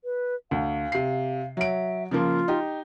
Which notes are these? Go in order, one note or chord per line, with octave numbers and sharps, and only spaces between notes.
B4
D2 F5
C3 C7
F#3 E5 D7
C#3 F3 A#3 F4
D#4 G4